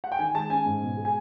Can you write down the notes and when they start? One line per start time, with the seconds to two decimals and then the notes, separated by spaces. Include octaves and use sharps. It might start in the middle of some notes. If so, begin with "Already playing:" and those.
0.04 F#5
0.12 G5
0.19 D#3 G#5
0.35 G#3 A5
0.50 C#4 G#5
0.66 G#2
0.82 B2
0.97 G#3
1.05 G#5